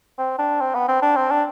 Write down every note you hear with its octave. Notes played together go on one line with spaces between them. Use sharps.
C4
D4
C4
B3
C4
D4
C4
D4